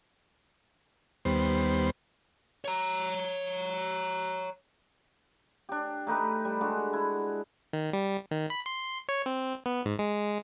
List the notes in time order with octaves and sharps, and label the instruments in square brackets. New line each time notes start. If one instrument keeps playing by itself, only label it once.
[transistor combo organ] D#2 G3 B3 C5
[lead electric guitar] C#5 A#5
[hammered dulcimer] D4 G4
A3 D#4 G4 B4
G3
G#3 D4 F#4
E4
[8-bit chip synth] D#3
G3
D#3
B5
C6
C#5
C4
B3
G#2
G#3